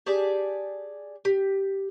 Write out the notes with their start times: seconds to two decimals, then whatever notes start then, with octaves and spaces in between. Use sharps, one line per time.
0.06 G4 G#4 D5 A5
1.25 G4